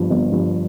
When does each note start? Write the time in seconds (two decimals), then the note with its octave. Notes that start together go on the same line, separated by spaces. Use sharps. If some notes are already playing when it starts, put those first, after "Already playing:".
Already playing: G1 G2 F3
0.10 G1
0.32 G2 F3